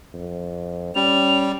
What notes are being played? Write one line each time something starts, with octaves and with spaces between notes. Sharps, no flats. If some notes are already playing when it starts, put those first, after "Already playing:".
F2
G3 C#4 F7